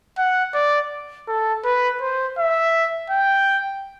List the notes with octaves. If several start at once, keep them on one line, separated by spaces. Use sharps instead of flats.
F#5
D5
A4
B4
C5
E5
G5